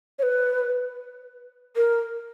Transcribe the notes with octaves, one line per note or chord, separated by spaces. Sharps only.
C#5
B4
A#4